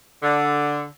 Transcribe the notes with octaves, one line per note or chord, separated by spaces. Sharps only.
D3